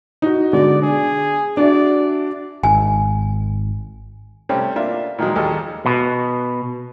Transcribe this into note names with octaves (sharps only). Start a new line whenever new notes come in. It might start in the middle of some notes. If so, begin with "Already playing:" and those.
D#4 F#4
B2 D3 G#3 D5
D4 G#4
D4 F#4 D5 E5
G#1 G#5
C3 G3 A3 C4 C#4
A#3 D4 F4 E5
A#2 D#3 F3 F#3 G#3
D#2 G3 G#3 G#4 A4 D#5
B2